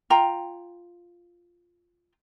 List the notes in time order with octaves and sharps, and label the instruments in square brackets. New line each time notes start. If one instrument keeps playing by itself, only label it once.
[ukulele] F4 G5 A#5